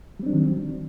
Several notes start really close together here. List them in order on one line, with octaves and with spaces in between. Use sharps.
G3 C4 D4 F#3 D#3